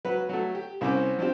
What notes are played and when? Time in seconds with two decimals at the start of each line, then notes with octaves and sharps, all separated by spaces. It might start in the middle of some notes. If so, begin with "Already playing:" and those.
0.05 F#3 B4
0.29 F#3 A3
0.55 G4
0.81 C2 C4 C#4 C5 D6
1.19 F3 C4 D4 G4